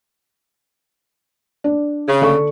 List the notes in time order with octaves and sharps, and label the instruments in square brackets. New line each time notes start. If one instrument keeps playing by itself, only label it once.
[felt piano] D4
[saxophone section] C#3
[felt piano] D3 A4 C#6